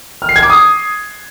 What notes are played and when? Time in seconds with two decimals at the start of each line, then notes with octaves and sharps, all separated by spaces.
0.22 F6
0.29 C7
0.36 G#6
0.43 D6
0.50 D#6